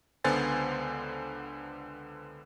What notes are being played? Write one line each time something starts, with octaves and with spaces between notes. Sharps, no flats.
C#2 D3 B3 C5 G#5 A6